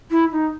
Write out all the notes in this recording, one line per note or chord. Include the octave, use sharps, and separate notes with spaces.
E4
D#4